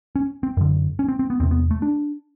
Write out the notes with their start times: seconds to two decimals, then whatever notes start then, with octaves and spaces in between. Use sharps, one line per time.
0.16 C#4
0.43 C4
0.57 F#2 D3
0.99 C#4
1.08 C4
1.19 C4
1.30 B3
1.40 E2 C4
1.43 C3
1.51 B3
1.71 A3
1.82 D4